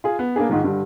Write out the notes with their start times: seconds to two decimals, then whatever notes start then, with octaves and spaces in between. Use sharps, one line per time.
0.04 F4 G#4
0.19 B3
0.36 A#3 B3 D4 G#4
0.49 G#2 D#3 F3
0.64 G2 D3 G3